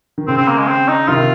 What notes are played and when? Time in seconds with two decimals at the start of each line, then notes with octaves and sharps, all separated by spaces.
0.18 D#3
0.27 C#3 C4
0.38 C4
0.48 A#3
0.58 G#3
0.67 C4
0.88 D#4
1.08 C3 D#3 F4